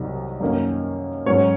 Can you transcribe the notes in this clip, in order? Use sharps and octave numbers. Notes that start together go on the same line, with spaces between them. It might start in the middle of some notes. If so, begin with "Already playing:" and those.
Already playing: C2 C3 D#3 F#3
F#2 D#3 A#3 C#4
G#2 F#3 C#4 C#5